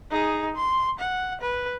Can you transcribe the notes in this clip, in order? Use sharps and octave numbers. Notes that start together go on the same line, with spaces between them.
D#4 G#4
C6
F#5
B4